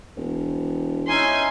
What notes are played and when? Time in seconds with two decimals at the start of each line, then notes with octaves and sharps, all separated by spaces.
0.17 E1
1.08 C#4 D#4 E4 G#5 C6